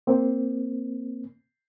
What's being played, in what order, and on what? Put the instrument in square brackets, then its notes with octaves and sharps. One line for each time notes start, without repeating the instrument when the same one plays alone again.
[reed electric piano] A#3 C4